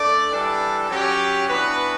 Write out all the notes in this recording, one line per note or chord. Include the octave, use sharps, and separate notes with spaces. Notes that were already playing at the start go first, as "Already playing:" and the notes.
Already playing: A3 D4 A4 D5
E3 G3 D4 A4
F#3 C#4 G4
E3 B3 D4 F#4 B4